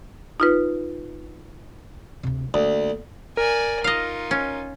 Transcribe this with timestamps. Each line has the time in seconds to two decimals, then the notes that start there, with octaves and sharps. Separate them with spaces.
0.40 D#4 F4 B4
2.23 D2 C3
2.54 D2 A#3 B3
3.37 A#4 D5 G#5
3.84 D#4 F4 D#5 F5
4.31 C#4